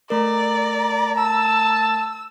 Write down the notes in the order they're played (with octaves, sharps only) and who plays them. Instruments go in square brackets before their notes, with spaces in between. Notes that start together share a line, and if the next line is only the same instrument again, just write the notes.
[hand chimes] A3 A#4 [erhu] D5 [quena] A#5
[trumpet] A5 [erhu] E6